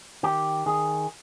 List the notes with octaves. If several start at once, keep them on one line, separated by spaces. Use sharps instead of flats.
D#3 G4
D#3 G#4